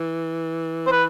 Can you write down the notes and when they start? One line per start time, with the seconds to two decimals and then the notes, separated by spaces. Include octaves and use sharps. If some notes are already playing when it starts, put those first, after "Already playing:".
Already playing: E3
0.87 C5
0.92 B4